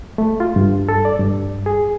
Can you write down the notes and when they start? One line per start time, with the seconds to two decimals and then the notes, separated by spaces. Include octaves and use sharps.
0.18 A3
0.40 F4
0.56 G2
0.89 A4
1.05 D5
1.19 G2
1.66 G#4